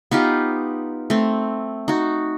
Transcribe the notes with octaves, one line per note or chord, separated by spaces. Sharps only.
B3 D#4 F4 G4
A3 C4
D#4 F#4